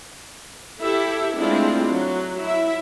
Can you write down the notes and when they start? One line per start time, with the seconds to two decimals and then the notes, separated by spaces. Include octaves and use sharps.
0.81 E4 G4 A4 E5
1.35 G#3 A3 C4 D4 E4 F4
1.89 F#3
2.41 E4 E5